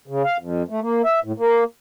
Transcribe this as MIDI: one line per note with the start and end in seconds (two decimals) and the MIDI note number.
0.07 0.23 49
0.24 0.37 77
0.38 0.63 41
0.70 0.80 57
0.81 1.02 58
1.04 1.20 76
1.24 1.32 45
1.38 1.64 58